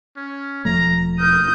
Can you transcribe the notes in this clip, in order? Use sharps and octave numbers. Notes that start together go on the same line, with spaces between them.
C#4
E1 F3 A3 A#5
A#4 D#6 G6